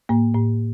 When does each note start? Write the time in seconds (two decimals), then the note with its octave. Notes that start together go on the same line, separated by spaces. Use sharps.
0.09 A2 A#3
0.34 A2